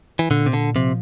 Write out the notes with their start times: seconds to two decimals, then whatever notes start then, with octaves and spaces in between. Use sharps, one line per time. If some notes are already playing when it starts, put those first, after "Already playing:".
0.19 E3
0.30 A#2 D3
0.46 C3
0.53 D3
0.76 C3 F3